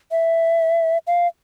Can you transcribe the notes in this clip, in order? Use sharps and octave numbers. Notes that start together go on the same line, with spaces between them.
E5
F5